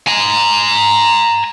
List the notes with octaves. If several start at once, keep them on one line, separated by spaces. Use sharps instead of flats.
G#5 A#5